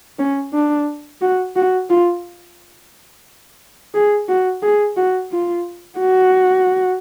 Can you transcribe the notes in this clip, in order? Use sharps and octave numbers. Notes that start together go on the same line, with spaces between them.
C#4
D4
F#4
F#4
F4
G#4
F#4
G#4
F#4
F4
F#4